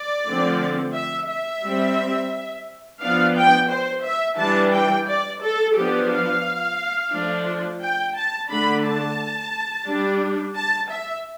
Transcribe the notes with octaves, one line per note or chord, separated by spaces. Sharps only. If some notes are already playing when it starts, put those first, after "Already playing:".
Already playing: D5
D3 F3 A3 C4
E5
E5
G3 C4
F3 B3 D4 F5
G5
C5
E5
E3 G3 D4 A5
G5
D5
A4
F3 B3 D4 G4
F5
F3 A3 D4
G5
A5
D3 A3 D4 B5
A5
G3 D4
A5
E5